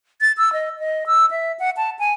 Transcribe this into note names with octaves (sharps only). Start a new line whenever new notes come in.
A6
E6
D#5
D#5
E6
E5
F#5
A5
G#5